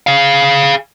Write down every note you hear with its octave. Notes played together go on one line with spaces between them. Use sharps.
G#4 F5